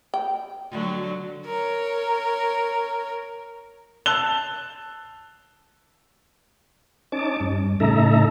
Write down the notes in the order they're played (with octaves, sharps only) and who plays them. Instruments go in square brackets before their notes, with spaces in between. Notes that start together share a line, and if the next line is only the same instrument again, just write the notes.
[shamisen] G5
[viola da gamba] D3 F#3
[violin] A#4 C#5
[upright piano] A5 E6 F#6 F7 G7
[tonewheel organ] C#4 D#4 A5 D6
G2
A2 C#3 D#4 A4 E5 A#5